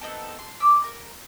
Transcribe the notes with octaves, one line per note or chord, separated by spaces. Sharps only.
B3 C4 D#4 A4
C6
B5 D6 E6
A#4